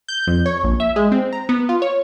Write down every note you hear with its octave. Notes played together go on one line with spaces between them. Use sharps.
G6
F2
C#5
A#1
E5
G#3
C4
A#5
B3
F4
C#5